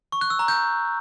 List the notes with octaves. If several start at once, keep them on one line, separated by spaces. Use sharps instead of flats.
C#6
F#6
E6
A#5
G6